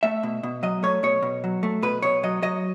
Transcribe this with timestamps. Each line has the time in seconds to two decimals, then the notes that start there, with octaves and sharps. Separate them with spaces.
0.03 A3 E5
0.23 B2
0.43 B2
0.63 F#3 D#5
0.83 A3 C#5
1.03 B2 C#5
1.22 B2
1.44 F#3
1.63 A3
1.82 B2 B4
2.02 B2 C#5
2.23 F#3 D#5
2.42 F#3 D#5